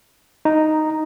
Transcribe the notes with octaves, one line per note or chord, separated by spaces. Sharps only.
D#4